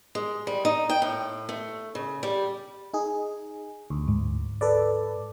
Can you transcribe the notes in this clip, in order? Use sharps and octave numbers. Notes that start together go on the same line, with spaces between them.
G#3
G3
D#4
G5
A2
A3
C#3
G3
D#4 G#4
D2
G#2
A4 B4 D5